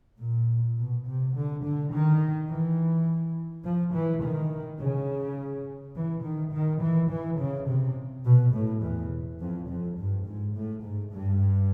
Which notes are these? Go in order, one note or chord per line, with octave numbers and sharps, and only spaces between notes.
A#2
B2
C3
D3
D3
D#3
E3
F3
E3
D#3
C#3
E3
D#3
D#3
E3
E3
C#3
C3
B2
A2
E2
F2
F2
G2
G#2
A2
G#2
G2